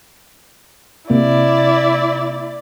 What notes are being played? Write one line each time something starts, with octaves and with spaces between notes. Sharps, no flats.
C3 A#3 E4 D5